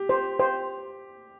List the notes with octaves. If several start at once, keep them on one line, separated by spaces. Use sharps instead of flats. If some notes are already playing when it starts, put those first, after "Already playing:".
Already playing: G4
C5
C5